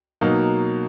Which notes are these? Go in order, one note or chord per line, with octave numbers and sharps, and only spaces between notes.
B2 F#3 A#3 D#4